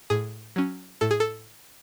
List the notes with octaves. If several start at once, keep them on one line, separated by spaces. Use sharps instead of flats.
A2 G#4
F#3 C#4
A2 A4
G#4
A4